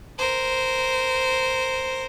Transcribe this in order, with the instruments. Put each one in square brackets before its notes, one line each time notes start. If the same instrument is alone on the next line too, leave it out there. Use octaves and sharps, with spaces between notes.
[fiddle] A#4 C5